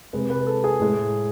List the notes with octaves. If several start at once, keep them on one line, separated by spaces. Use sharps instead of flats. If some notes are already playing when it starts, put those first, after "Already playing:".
C3 G#3 B4
B4
A4
G#4
A2 G#3